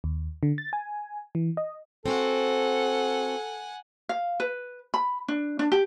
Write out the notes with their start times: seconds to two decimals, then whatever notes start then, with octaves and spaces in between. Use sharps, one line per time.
0.04 D#2
0.43 D3
0.58 A6
0.73 G#5
1.35 E3
1.57 D#5
2.06 C4 F#4 A4 F#5 G#5
4.09 F5
4.40 B4
4.94 B5
5.28 D4
5.59 D4
5.72 G4